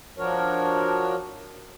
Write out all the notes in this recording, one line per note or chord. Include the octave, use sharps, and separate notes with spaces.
F3 D4 F#4 A#4 C#5